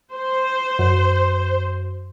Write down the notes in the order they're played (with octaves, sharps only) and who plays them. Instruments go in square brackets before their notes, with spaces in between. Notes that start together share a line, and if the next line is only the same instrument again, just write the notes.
[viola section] C5
[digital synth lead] F#2